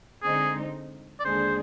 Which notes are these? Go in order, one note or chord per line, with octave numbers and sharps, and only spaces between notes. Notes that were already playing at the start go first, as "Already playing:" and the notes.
D3 G#3 C4 D#4 G#4
D5
D#2 D3 G#3 D4 G#4 C5